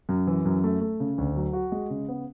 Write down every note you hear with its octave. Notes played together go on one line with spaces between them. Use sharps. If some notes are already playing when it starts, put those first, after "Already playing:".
F#2
E3
F#2
A3
A3
C#3
D2
F#3
F#4
G#3
C#3
B3